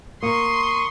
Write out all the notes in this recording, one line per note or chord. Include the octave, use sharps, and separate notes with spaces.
A#3 C6 C#6 D#6